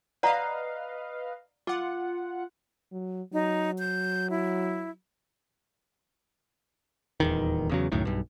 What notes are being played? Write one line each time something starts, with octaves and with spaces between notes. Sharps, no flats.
B4 D5 D#5 F5 F#5 A#5
F4 F#5 D6
F#3
F#3 D#4
G6
E4
D#1 E2 D#3
E2 C#3 F#3
C#2 F#2 A2 D#3
B1 G2